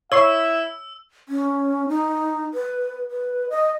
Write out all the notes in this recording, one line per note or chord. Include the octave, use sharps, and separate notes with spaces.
E4 C#5 E5 C#6 E6 C7
C#4
D#4
B4
B4
D#5